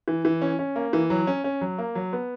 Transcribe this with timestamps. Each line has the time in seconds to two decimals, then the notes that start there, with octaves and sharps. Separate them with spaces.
0.08 E3
0.25 E3
0.42 C#4
0.59 C#4
0.76 A#3
0.93 E3
1.10 F#3
1.27 C#4
1.44 C#4
1.61 F#3
1.78 A#3
1.95 F#3
2.13 B3